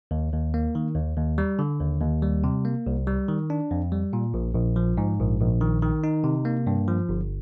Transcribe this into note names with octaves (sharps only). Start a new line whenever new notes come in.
D#2
D#2
A#3
D#3
D#2
D#2
G3
D3
D#2
D#2
G3
C3
A#3
C2
G3
D#3
D4
F2
G3
A#2
A#1
A#1
F3
G#2
A#1
A#1
D#3
D#3
D#4
C3
A#3
G2
F3
G1